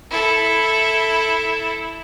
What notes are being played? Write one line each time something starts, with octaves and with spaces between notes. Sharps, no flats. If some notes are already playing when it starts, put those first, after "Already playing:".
E4 A4